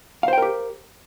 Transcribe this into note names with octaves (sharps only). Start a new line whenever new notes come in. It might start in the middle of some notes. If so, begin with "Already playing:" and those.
G4 A#4 C5 F5 G5